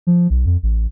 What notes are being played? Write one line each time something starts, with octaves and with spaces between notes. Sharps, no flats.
F3
B1
F2
A1